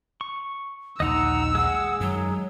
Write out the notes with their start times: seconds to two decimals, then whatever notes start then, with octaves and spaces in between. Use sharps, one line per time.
0.21 C#6
1.00 A#1 D#2 D3 D#4 D#5 F#5 A#5 E6
1.55 G#3 G#4 F#5
2.00 F#2 D#3 F#3